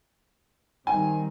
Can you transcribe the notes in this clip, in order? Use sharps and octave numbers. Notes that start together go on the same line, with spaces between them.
D#3 G3 C4 G#5